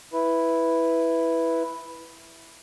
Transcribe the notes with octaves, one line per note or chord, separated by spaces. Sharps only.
E4 B4